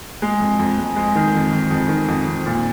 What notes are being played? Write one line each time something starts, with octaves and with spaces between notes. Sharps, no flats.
G#3
F2
F2
G#3
G#3
D#3
F2
F2
F2
D#3
F2
F2
A#2